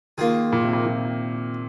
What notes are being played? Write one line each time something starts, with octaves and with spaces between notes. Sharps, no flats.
D#3 A#3 F4 G#4
A#2
C3
A#2
A#2